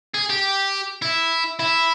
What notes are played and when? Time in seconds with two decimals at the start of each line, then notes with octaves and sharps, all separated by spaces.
0.14 G#4
0.30 G4
1.02 E4
1.59 E4